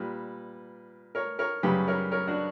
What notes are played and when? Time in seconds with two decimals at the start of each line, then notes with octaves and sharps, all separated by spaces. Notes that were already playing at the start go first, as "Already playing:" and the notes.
Already playing: A#2 G3 B4
1.15 A#4 C#5
1.39 A#4 C#5
1.63 F#2 C#3 G3 G4 B4
1.87 A#4 C#5
2.11 A#4 C#5
2.27 D4 F#4